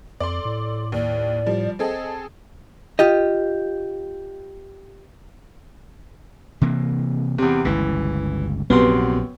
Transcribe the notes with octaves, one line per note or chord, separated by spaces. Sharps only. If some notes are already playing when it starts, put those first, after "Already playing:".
F2 A4 D5 C6
A2
D#2 D5
F3 G3
C4 G#4 A4 D#5
F4 G4 D#5
C3 E3 A#3
E2 C3
G1 C#2 C#3 E3
A#1 F#2 C3 B3 C6